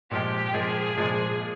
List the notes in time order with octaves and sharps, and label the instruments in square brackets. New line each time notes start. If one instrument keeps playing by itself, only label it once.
[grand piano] A#2 F3 G#3 [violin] G4
[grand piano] A#2 F3 G#3 [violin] G#4
[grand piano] A#2 F3 G#3